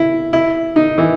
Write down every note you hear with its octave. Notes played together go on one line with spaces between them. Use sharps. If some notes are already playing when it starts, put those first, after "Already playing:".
Already playing: E4
E4
D#4
E3